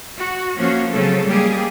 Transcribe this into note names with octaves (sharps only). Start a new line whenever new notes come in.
F#4
F3 A#3 C#4 F#4
C#3 F#3 C4 A4
G3 G#3 A#3 G4 G#4